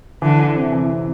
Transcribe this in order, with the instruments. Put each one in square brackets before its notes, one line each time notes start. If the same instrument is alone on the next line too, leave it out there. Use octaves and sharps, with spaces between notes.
[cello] D3 [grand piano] E3
[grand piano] E3
C3
E3
C3